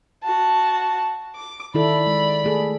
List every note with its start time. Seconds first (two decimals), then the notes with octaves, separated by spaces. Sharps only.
0.23 F#4 A5
1.36 D6
1.74 D#3 E4 A4 D5 B5
2.06 G#3
2.44 A3 G#4 A4